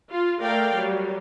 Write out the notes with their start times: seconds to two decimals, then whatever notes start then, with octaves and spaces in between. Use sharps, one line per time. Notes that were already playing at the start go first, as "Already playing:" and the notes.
0.10 F4
0.41 A3 A#4 D5 F5 G5
0.76 F#3 G3